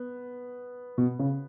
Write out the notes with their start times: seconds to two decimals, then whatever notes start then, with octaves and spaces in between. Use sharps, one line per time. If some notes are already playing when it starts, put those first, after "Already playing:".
Already playing: B3
0.98 B2
1.19 C#3